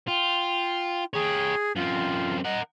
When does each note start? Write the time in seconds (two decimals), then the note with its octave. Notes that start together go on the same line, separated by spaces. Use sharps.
0.08 F4 G5
1.14 G4 G#4 C#5
1.76 F#2 C4 F4
2.44 A#4 D#5 F#5